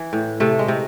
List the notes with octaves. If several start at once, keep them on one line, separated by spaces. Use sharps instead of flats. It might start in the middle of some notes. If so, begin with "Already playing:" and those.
Already playing: E3
A2
C3 A3
G#3
C3